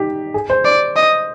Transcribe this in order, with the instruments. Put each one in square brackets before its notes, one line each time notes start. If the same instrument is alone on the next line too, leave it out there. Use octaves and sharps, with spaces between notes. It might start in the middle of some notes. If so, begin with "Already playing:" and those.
Already playing: [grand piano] D#4 G4
G#4
C5
[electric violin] D5
D#5